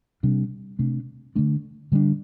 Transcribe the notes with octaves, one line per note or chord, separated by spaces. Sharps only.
C3 G3 D4
C3 A3 D4
D3 A3 D4
D3 G3 D4